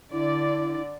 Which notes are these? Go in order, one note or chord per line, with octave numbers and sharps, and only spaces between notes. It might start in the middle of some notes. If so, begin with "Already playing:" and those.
D3 E4 D5